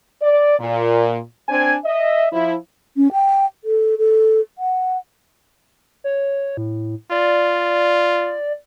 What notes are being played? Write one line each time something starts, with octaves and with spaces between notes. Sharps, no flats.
D5
A#2
C4 D4 C5 G#5
D#5 E5
F3 E4
C#4
G5
A4
A4
F#5
C#5
A2
F4 D5